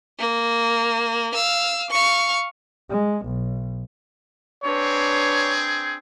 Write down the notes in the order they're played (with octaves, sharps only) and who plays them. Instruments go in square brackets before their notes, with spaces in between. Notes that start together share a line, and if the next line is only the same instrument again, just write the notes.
[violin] A#3
F5 E6
F5 C#6
[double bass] G#3
B1
[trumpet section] C4 G#4 [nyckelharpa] D4 B4 [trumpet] C#5